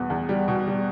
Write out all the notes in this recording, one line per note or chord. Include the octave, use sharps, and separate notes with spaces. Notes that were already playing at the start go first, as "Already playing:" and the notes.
Already playing: E2 B2 G3 B3
E2
G3
B2
G3